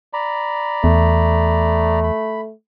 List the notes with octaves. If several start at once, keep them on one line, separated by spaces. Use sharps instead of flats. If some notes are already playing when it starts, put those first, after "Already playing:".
D5 A#5 B5
E2 A3
B5